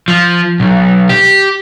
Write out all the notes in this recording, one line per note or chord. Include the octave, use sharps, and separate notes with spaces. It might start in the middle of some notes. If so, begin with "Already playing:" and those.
F3
B1
G4